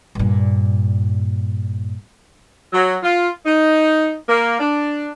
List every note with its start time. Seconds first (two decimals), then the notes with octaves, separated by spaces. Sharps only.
0.15 G2 A#2
2.73 F#3
3.02 F4
3.45 D#4
4.28 A#3
4.59 D4